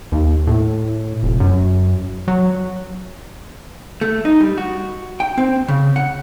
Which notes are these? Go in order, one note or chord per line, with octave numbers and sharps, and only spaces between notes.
D#2
A2
F1
F#2
F#3
A3
D#4
G3
F#4
G5
C4
C#3
F#5